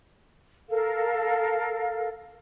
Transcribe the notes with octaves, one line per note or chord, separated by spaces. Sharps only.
A4 A#4 F5